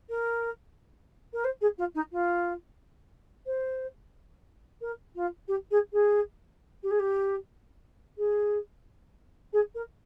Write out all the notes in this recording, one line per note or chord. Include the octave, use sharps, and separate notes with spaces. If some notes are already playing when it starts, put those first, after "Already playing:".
A#4
A#4
C5
G#4
F4
D#4
F4
C5
A#4
F4
G4
G#4
G#4
G4
G#4
G4
G#4
G#4
A#4